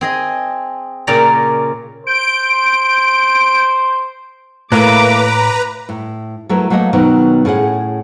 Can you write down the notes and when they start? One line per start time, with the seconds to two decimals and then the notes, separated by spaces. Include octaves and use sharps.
0.01 C4 G#4 D#5
1.07 A#2 C#3 A#4 D5 G5 A#5
2.07 C5 G6 D7
4.72 A2 E3 A3 A#3 B4 A#5 D6
5.89 A2
6.49 F#3 A3 E4 A#4 B4
6.70 F#3 A3 A#3 C#5 D#5
6.93 B2 D#3 F#3 B3
7.45 A2 C#4 G#4 F#5